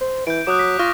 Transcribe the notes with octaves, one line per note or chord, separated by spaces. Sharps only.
C5
E3 G6 D7
F#3 D6 D#6 F#6
B6
F4 C#6 F6 A#6